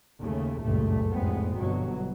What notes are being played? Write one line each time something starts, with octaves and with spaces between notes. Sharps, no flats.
D#2 C#3 A3
F#1 C#2 G2 A#2 A3
F1 A2 G#3 B3 C4
G1 B2 F#3